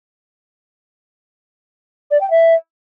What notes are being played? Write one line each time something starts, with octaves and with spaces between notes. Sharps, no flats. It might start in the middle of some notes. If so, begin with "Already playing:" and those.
D5
G5
E5